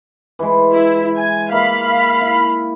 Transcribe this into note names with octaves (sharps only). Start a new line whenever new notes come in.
E3 G#3
E4
G#5
A#3 E5 F5 B5 C6
E4